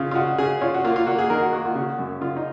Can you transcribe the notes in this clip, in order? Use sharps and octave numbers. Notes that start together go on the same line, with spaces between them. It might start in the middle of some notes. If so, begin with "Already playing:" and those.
Already playing: C#3 F4
F4
C#3 F#4
C#3 G#4
C#4 F4
F#4
A#3 F4
F4
A#3 F#4
G#4
D#3 A#4
F#4
A#3 F#4
F4
C#3 F#4
F#2
C#3 F4
D#4